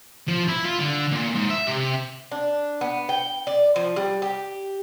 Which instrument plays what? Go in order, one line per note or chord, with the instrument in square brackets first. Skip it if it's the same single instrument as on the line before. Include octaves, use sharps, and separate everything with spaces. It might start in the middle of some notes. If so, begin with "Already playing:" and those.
[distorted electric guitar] F3
E4
F4
D3
A#2
G#2
E5
C3
[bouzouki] D4
B3
G5
D5
F3
G3
G4